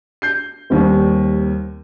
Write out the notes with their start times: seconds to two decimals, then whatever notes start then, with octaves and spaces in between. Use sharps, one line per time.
0.22 G6 C7
0.70 D#2 G3 C4